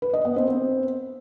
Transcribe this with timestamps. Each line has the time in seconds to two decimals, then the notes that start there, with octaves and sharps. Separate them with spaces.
0.02 B4
0.13 D#5
0.25 B3
0.36 C4
0.48 C4